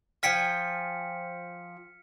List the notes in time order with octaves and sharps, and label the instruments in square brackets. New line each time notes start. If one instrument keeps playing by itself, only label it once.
[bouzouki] F3 G5 G#5 [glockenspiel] F6 B6 C#7